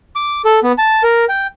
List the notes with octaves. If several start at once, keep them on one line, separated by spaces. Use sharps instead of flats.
D6
A4
B3
A5
A#4
G5